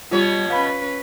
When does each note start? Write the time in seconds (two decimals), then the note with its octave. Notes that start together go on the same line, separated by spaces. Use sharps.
0.11 B2 G3 B3 F4 G4 C#5
0.50 C#4 B4 F5 B5